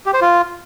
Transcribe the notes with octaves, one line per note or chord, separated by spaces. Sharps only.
G4
C5
F4